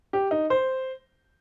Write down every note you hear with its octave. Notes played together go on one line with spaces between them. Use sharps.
G4
D#4
C5